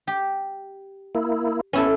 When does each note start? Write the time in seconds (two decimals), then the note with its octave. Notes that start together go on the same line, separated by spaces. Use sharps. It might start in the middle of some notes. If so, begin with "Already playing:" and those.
0.07 G4
1.15 A#3 E4
1.73 B3 C#4 E4 A4